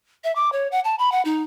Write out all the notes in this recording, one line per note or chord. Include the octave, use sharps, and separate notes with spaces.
E5
D6
C#5
F#5
A5
B5
F#5
D#4